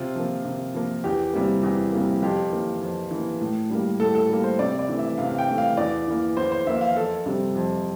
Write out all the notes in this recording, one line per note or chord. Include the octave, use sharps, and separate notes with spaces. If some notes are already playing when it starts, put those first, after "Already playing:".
Already playing: C3 F4
F3 A#3
C3
F3 A#3
E2 G4
C3 G3 A#3
E2
C3 G3 A#3
F2 G4
E3 A#3
F2
E3 A#3
A2
G3 A#3
A2 A4
A4
G3 A#3
C5
C3 D5
D5
E3 A3
E5
C3 F5
F5
G5
E3 A3
F5
E2 D5
E3 A#3
E2 C5
C5
E3 A#3 E5
F5
F2 A4
C3 G3
F2